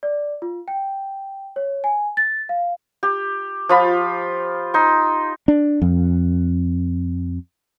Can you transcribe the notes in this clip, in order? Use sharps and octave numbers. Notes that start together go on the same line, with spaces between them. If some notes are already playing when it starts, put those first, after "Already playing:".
D5
F4
G5
C#5
G#5
A6
F5
G4
F3 F4 B5
D#4 C6
D4
F2